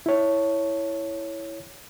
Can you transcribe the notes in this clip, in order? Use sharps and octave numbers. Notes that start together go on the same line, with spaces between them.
E4 C#5